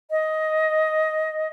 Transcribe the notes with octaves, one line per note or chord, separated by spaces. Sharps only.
D#5